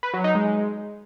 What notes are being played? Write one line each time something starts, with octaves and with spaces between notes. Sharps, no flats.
B4
F#3
D#4
G#3